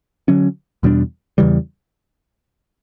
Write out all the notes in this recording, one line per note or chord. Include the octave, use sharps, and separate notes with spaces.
D3 F#3 C#4
E2 B2 G3 D4
E2 C#3 E3 G3